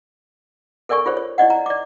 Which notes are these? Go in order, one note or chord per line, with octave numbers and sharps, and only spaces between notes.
A4 A#4 D5 G#5 C#6
F4 G#4 C5 C#5
C#5
E4 D5 D#5 F#5
A#5
D5 D6